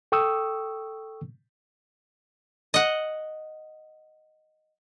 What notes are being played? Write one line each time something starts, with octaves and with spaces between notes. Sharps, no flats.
A4 G5 C#6 D#6 E6
D#5 F#5